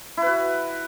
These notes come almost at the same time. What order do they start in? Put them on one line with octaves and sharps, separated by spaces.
E4 B4 F#4